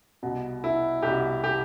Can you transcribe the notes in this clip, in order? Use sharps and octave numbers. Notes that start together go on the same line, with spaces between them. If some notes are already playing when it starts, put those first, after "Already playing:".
C2 B2
E4
C2 B2 G4
G4